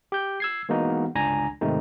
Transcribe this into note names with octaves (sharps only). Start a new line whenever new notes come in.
G4 G6
E6 G#6 C7
E3 G#3 A#3 B3 D#4 F#4
G1 C#2 D4 G#5 A#5 A#6
G#2 C3 D#3 A3 C4 D#4